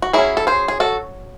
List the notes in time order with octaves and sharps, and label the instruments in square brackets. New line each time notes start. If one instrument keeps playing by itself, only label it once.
[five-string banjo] F#4
F#3 C#4 E4 G#4
A4
G#4 C5
G#4
F#4 A4